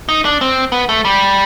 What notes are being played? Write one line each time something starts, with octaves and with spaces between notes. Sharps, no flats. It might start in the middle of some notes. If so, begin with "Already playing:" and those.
D#4
D4
C4
B3
A3
G3